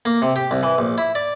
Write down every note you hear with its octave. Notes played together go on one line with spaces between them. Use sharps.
A#3
C3
G4
C2
E3
A#1
E4
D5